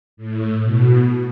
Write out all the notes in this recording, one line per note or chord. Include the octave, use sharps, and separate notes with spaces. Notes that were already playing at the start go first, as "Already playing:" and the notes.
A2
B2